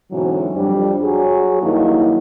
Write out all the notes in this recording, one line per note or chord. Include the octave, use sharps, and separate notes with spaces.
G#2 B2 D3 E3 F#3 C4
F2 G3 D4
F#3 G#4
G2 D#3 F#3 A#3 D4 E4